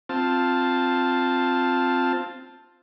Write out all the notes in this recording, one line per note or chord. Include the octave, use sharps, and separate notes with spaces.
C4 F4 A5